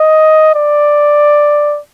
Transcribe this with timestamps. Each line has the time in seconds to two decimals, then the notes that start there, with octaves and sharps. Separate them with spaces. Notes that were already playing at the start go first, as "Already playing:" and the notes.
Already playing: D#5
0.55 D5